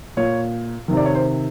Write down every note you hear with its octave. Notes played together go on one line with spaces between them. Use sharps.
A#2 C#5
C3 D#3
D5
C#5
C5